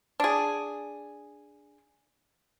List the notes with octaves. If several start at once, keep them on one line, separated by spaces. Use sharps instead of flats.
D4 G#4